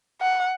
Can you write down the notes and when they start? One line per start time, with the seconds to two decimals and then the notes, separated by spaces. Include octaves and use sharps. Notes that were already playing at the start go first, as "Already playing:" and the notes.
0.21 F#5